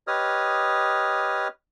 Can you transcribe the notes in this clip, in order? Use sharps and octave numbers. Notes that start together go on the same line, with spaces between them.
G4 B4 C#5 D#5 D#6 F6